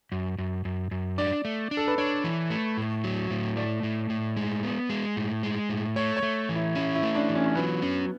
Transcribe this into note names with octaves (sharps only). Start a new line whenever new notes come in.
F#2
F#2
F#2
F#2
D4 D5
A3
D4
A4
B4
D4 C#5
E3
A3
A2
F#3
A2
A3 D5
A2
A2
G#3
B3
G#3
A2
G#3
A2
A3 C#5
C#5
A3
E3
E4
C#4 E4
E4
A3
D4
E3
C#4
C#4
F#3 B3
C#4